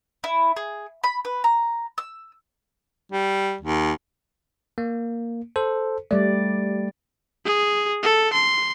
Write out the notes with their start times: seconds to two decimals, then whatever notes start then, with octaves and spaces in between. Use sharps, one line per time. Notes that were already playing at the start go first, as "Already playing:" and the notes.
0.24 E4
0.56 G#4
1.04 B5
1.25 B4
1.44 A#5
1.98 E6
3.12 G3
3.61 D#2
4.78 A#3
5.56 A4 C5
6.11 G3 A3 D5
7.46 G#4
8.03 A4
8.33 C6